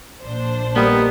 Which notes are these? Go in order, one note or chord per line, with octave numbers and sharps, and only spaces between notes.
A#1 D4 C5
G3 A#3 B3 A#4 D#5